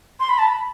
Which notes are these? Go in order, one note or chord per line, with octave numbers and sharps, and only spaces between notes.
C6
B5
A5
B5